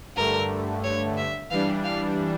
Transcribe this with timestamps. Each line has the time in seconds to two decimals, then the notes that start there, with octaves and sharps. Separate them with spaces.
0.16 G2 D3 A3 A#4
0.83 C#5
1.17 E5
1.50 E3 G3 D4 F5
1.84 F5